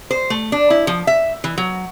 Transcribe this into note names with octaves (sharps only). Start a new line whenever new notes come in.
C5
A3
D4
E4
F3
E5
E3
F#3